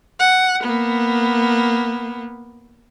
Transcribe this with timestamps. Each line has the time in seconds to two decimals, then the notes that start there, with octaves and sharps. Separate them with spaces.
0.20 F#5
0.63 A#3 B3